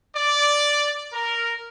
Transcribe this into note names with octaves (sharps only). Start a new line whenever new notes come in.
D5
A#4